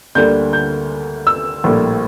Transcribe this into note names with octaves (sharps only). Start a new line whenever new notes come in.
D2 D3 G3 A#3 G6
G6
E6
A#1 A2 G3 A#3